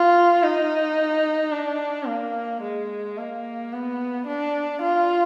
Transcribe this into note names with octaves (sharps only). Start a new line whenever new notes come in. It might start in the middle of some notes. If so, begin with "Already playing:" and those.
Already playing: F4
D#4
D4
A#3
G#3
A#3
B3
D4
F4